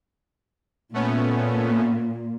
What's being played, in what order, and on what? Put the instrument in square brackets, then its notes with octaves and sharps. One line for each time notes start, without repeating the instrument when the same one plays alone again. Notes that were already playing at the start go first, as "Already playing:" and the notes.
[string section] A#2 [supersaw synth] A3 B3 C#4